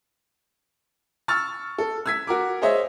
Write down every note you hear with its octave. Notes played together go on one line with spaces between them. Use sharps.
C#6 E6 F6 A6
A4
E6 G#6 B6
F#4 A#4 D6
G#4 C5 C#5 D#5 E5